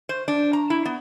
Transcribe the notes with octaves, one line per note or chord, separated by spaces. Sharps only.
C5
D4
A#5
E4
B3